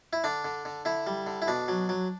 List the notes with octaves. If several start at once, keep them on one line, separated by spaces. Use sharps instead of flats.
E4
D3 D4
D3
D3
D3 E4
G3
D3
E4
B2 D4
F#3
F#3